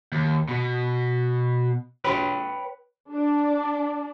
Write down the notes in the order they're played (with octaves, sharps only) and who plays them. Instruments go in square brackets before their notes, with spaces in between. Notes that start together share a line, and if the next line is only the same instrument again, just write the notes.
[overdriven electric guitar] D#2
B2
[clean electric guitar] B4 C#5 G5 B5
[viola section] D4